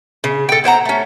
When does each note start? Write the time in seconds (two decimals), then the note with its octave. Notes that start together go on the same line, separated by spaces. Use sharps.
0.24 C#3
0.49 A4 G5
0.64 E4 C5 F#5 A#5
0.85 A3 C#4